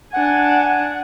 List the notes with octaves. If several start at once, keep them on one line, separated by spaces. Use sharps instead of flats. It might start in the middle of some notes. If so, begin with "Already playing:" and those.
D4 F#5 G#5
F#5